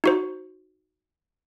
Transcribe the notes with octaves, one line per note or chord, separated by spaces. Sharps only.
D#4 F#4 C5